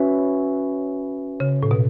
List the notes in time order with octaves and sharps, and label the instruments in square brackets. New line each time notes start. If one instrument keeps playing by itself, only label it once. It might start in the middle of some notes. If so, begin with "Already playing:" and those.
Already playing: [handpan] C#4 F#4 B4 E5
[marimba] C#3
A2
B2